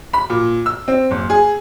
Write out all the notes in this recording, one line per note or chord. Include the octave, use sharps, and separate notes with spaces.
B5
A#2
E6
C4
F#1
G#4